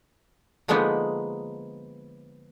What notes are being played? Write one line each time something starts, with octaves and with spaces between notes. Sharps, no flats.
D3 F3 G#3 A#3 B3 D#4